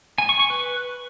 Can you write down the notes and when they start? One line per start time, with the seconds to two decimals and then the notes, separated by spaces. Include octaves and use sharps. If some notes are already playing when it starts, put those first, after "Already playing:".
0.18 G#5
0.29 C#6
0.39 C#6
0.50 B4